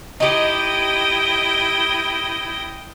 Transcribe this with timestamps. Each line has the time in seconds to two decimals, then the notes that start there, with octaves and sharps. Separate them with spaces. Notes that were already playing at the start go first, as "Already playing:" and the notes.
0.20 D#4 E4 G4 D#5 G5